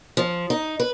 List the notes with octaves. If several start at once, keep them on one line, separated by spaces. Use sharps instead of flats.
F3
D#4
B4